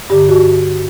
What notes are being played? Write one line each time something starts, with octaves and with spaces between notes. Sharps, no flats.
G2 D3 G4
F#4